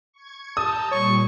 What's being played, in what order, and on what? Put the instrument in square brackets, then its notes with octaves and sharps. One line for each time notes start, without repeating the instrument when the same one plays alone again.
[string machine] C#6 G#6
[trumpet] A5 [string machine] A#5 E6 G6 [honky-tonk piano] D#6
[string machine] A#2 G3 [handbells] C#5 [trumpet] C#6